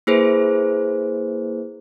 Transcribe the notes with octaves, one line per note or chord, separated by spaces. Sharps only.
A#3 E4 G#4 B4 C5